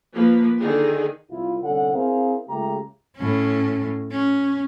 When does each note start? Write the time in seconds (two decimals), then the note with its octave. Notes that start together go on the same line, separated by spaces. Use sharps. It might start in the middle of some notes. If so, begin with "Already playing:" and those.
0.13 F3 A#3 B4
0.59 D3 D#3 D#4 G#4
1.30 C2 E4 F4
1.63 C2 D3 C#4 A4 F#5
1.93 C4 E4 G#4 A#4 C5 F5
2.49 C#2 C#3 A3 G4 A#5
3.16 A2 C#4
4.12 C#4